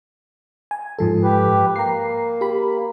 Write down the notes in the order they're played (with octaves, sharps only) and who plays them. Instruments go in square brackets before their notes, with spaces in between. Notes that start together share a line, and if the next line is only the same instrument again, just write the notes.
[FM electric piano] G#5
G#2 F3 A4
[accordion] G4 B4
[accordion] A#3 [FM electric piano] A#5 C7
[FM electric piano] G4 B5